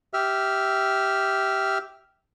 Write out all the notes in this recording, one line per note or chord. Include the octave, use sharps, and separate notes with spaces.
G4 E5 F6